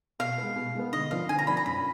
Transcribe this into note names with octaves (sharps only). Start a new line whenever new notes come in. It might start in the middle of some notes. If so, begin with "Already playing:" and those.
B2 F5
G#3 B3
B2
G#3 B3
D3 D#5
F3 B3 D4 F5
D3 G#5
A#5
F3 B3 D4 B5
A#5
F#2 B5